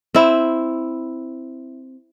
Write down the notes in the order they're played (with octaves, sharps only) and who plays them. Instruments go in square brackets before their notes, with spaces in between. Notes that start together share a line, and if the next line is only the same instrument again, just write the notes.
[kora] C4 E4